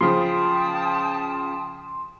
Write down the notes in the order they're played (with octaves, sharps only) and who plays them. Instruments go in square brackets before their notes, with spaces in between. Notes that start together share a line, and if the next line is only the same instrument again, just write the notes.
[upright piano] C#3 F3 [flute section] G5 A5 D#6 [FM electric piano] C6